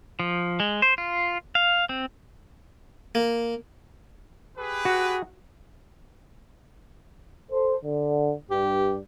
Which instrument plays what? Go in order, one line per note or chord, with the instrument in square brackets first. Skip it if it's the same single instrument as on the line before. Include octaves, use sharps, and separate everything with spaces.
[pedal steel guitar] F3
G#3
C5
F4
F5
C4
[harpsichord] A#3
[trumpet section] G4 G#4 B4
[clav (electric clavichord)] F#4
[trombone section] A4 C5
D3
[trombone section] G2 [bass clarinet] G4